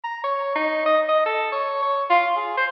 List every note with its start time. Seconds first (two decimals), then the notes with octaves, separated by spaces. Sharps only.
0.04 A#5
0.24 C#5
0.55 D#4
0.86 D#5
1.08 D#5
1.26 A4
1.52 C#5
1.82 C#5
2.10 F4
2.36 G#4
2.57 C5